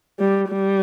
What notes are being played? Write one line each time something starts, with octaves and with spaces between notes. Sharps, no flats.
G3
G3